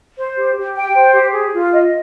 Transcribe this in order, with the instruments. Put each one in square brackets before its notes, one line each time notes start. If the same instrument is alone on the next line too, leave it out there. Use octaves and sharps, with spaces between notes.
[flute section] C5
G4
G4
G5
C5
G4
G#4
F4
D#5